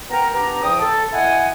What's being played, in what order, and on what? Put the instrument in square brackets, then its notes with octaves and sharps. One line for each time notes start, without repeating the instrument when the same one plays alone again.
[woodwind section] B3 A#4 G5 A#5
B3 D4 G4 A#5
E2 F3 G5 D#6
A4
E4 D#5 F#5 G#5